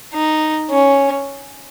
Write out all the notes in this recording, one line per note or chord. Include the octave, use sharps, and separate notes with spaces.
D#4
C#4